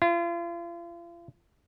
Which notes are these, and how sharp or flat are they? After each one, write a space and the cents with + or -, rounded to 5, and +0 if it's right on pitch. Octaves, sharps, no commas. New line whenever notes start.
F4 -40